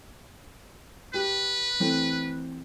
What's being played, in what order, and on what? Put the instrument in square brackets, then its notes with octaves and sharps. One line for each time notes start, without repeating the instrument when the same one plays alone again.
[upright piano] G4 [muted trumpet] B4
[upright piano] E3 A3 C4